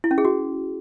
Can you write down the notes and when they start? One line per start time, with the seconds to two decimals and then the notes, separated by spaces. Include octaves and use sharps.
0.04 E4
0.11 C#4
0.18 G#4
0.25 F#4